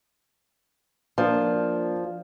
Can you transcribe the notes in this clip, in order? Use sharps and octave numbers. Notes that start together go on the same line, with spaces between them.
F3 A#3 D4